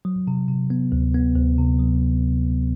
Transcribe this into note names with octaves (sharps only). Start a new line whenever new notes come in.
F#3
C3
C3
B3
D2
B3
D2
C3
F#3